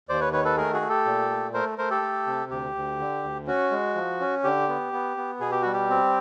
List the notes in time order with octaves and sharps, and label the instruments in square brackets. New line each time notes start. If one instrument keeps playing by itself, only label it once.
[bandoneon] D#2 C5 D5
B4 C#5
D#3 B4 C#5
A4 B4
A3 G#4 A#4
F#4 G#4
A3
G4 A4
A#2
A3
A3 A#4 C5
A3 A#4 C5
G4 A4
A3
C3
D2 G4
D2
D3
D2
C#4 F#4
G#3
F3
C#4
D3 G4
B3
B3
B3
B2 G#4
G4
G3 F#4
G4
C4